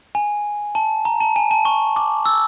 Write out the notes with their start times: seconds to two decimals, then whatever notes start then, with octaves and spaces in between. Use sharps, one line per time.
0.15 G#5
0.75 A5
1.05 A#5
1.21 A5
1.36 G#5
1.51 A5
1.65 C#6
1.96 D6
2.26 E6